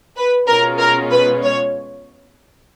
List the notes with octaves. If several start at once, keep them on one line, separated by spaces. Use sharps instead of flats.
B4
B2 G#3 C#4 F4 A#4
A#4
B4
C#5